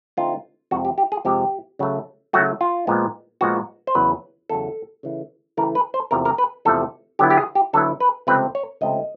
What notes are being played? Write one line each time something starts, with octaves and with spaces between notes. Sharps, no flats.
D3 F3 A3 C4 D#4 F4
F2 C3 F3 G#3 C4 F#4
G4
G4
G#4
F2 C3 F3 G#3 C4 G4
C#3 F#3 A3
C#3 F#3 A3 F#4
F4
A#2 F3 G#3 B3
A#2 F3 G#3 B3 F#4
C5
E2 C#3 F#3 B4
E2 C#3 F#3 A4
C#3 E3 A3
C#3 E3 A3 A#4
B4
C5
E2 C3 F3 A3 A#4
A#4
B4
E2 C3 F3 A3 A4
D3 F#3 B3 E4 G4
G4
G#4
G4
D3 F#3 B3 E4 A4
B4
C#2 C3 F3 A3 C4 B4
C#5
C#2 C3 F3 A3 C4 D#5